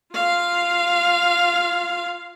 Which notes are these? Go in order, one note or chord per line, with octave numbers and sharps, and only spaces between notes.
F4 F5